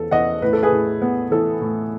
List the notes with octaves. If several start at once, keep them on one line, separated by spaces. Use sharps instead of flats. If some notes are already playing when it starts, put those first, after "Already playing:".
Already playing: E2 A4
E2 D#5 F#5
A2 B4
A4
G#4 B4
A2
B3
E3 A4
A2